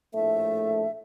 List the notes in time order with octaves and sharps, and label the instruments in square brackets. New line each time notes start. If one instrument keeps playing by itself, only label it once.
[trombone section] A#1 A2 A3 [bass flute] E5